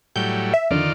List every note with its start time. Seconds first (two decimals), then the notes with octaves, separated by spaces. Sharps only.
0.16 A2 F#3 G3 G6
0.54 E5
0.71 F2 D3 D#3 F4 D5